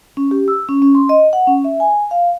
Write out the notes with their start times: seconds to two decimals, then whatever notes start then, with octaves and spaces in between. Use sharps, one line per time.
0.17 C#4
0.31 G4
0.48 E6
0.69 C#4
0.82 C#4
0.95 C6
1.09 D#5
1.33 F#5
1.47 C#4
1.64 E5
1.80 G#5
2.11 F5